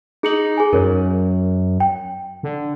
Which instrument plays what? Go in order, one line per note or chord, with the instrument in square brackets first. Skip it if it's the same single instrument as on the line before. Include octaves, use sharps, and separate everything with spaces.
[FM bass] D#4 [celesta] G#4 C#7 F#7
[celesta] G#4 G#5
[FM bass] F#2 [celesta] A#4 C#5
[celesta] G5
[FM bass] D3